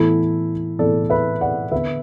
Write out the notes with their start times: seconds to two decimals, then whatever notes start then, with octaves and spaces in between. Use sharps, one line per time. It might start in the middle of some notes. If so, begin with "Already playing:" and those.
Already playing: A2 E3 B3 E4 A4
0.79 A2 E3 B3 A4 D5
1.10 B4 E5
1.41 D5 F#5
1.72 D3 B3 B4 E5